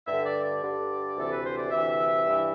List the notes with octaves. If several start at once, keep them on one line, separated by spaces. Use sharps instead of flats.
G2 D3 E5
D5
D5
G2 D3
D2 C3 E3 A4
B4
C5
D5
D2 C3 E3 E5
G2 E3